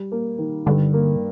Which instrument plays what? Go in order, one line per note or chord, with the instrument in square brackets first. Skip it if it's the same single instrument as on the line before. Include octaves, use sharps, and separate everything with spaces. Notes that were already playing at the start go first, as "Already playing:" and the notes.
Already playing: [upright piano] G3
A#3
D#3
[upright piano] G2 [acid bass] D3
[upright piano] A#3